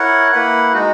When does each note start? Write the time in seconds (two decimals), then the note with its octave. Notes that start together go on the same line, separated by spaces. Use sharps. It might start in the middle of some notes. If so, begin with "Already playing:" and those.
Already playing: E4 A#4 C#5 F#5
0.32 A#3 E4 B4 F#5
0.73 G#3 D#4 F#4